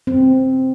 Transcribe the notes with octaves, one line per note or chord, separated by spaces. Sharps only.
C4